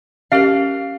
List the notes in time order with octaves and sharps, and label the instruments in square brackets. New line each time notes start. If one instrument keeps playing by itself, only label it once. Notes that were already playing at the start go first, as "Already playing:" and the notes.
[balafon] C#4 G4 A#4 [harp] F5